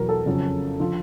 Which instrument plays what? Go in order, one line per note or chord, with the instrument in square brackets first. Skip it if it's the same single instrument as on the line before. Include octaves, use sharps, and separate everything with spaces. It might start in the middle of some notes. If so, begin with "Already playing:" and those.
Already playing: [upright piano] E2 B2 F#3 A#4
A4
F2 C#3 F#3
D3 F3